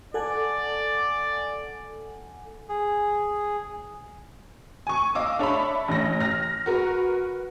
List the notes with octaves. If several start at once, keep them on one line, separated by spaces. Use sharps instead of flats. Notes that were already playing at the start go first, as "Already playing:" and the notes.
A4 D5 F#5 G#5
G#4
G#5 C#6
D#5 F5 D6 E6
D4 C#5 E5 B5
A1 A#6
F6 A#6
F#4 A#4 B4